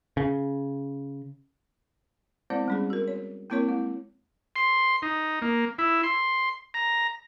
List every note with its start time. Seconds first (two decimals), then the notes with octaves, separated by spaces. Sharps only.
0.17 C#3
2.50 G#3 B3 C4 E4 C5 D5
2.68 G3 C#4 G#4
2.90 F#4 A#4
3.08 C#5
3.50 A#3 C4 E4 A#4 C#5 C#6
3.68 G#3 E4
4.56 C6
5.02 D#4
5.42 A#3
5.79 E4
6.03 C6
6.74 A#5